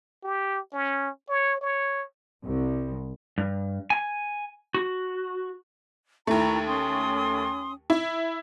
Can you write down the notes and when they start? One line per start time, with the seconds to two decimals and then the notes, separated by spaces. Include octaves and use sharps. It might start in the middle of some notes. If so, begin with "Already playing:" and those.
0.23 G4
0.73 C#4
1.29 C#5
1.61 C#5
2.45 C2
3.38 G2
3.90 G#5
4.74 F#4
6.27 D#2 A3 E4 A#5
6.66 C#4 C6 D#6
7.90 E4